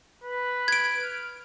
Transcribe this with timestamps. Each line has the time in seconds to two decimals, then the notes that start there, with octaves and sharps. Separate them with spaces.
0.23 B4
0.68 G#6 D7
1.03 F6